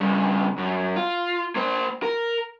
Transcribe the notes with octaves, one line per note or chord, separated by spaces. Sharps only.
G2 C#3
F#2
F4
A#3 C5
A#4